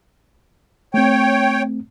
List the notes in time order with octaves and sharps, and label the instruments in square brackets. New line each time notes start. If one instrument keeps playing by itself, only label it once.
[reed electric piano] A3 C4 [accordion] C#5 G5